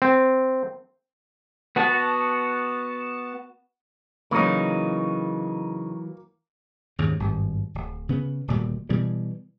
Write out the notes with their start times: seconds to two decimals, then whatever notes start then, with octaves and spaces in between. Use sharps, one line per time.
0.02 C4
1.76 B3 F#4 A5
4.31 C#3 E3 F#3 A#3 D#4
6.99 D#2 G#2 C#3
7.20 G#1 G2
7.74 D1
8.09 C#3 B3
8.48 D#1 D2 A#2 G3
8.89 B2 E3 G3